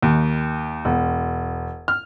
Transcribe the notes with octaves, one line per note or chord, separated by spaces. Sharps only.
D#2
E1
F6